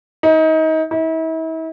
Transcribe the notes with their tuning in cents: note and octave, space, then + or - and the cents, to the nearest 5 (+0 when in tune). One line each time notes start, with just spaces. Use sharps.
D#4 +30
E4 -40